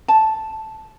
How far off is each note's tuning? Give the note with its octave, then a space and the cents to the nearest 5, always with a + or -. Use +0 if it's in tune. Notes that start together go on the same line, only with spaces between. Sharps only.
A5 -5